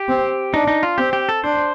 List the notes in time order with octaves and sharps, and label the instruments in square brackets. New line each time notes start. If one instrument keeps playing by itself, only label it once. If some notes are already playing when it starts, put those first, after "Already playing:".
Already playing: [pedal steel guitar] G4
[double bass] C4
[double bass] D4 [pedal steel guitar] D#4
[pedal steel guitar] D#4
F4
[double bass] C4 [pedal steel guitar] G4
[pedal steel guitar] G4
A4
[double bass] D4 [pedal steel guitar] C5